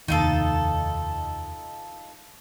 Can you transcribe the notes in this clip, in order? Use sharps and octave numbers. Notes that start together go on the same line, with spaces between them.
F1 D#2 D#3 D#4 F4 A4